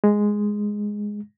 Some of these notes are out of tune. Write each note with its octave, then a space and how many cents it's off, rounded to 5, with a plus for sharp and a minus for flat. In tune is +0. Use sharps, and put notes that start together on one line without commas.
G#3 +0